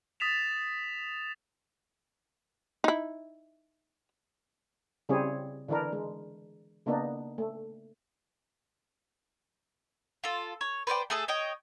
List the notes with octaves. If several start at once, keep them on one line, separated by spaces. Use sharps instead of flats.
D#6 A6 B6 E7 F7
D#4 E4
C#3 G3 C4 E4 G#4 C#5
D3 E3 D4 E4 A#4
G#3
C#3 A#3 B3 D4 D#4
A3
F4 A4
C#5
B4 C5 D5 G5
A3 G#4 A4 E5
C#5 D#5 G5